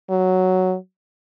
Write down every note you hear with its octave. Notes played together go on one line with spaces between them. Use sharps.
F#3